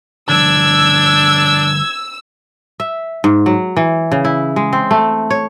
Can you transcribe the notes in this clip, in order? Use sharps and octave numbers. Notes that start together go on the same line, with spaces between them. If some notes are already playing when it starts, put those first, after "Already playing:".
D3 F3 G3 D4 E6 G#6
E5
G#2
F#3
E3
C#3
E4
G#3
C4
A3
C#5